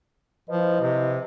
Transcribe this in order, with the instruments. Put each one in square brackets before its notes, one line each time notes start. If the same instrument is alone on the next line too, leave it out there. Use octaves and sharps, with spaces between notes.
[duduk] F3 [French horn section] E4 B4 D#5
[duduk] C3